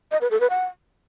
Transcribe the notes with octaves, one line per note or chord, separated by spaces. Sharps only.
D#5
B4
A4
B4
F#5